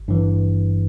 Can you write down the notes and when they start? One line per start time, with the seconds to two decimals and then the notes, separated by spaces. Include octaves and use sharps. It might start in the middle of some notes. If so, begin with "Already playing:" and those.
Already playing: G#1
0.08 G2 E3